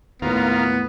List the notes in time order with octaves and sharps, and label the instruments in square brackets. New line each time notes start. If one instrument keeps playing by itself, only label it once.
[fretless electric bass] D#2 A2 [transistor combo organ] A#3 F4 [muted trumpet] B3